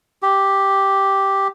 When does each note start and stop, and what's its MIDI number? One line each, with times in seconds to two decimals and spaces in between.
0.22 1.48 67